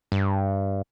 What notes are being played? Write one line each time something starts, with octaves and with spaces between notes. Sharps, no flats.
G2